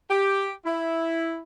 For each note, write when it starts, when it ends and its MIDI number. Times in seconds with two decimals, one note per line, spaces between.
0.10 0.52 67
0.65 1.40 64